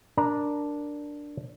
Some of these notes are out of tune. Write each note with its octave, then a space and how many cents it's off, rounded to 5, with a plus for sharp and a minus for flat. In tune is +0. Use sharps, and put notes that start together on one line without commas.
D4 +0 A#4 +0 A#5 +5